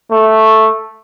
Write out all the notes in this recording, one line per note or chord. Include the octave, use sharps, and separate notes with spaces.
A3